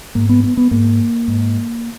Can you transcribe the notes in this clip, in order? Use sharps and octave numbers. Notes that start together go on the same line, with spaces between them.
G#2 A#3
B3
B3
B3
G#2 A#3
G#2